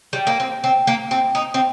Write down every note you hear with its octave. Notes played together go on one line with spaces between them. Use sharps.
G3
A#3
C4
C4
A#3
C4
D#4
C4